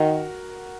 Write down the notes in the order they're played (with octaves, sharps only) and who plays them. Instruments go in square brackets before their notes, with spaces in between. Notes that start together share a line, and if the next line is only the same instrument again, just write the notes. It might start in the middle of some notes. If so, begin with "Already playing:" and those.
Already playing: [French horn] D#3 [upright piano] F#4 A#4